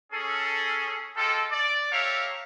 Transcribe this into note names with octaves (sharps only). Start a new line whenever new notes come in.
C#4 G#4 A4
G#3 F4 G4 A4
D5
G4 A4 A#4 C#5 E5 F5